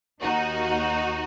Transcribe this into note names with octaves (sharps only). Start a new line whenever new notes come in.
D#2 D#3 A#3 D#4 F#4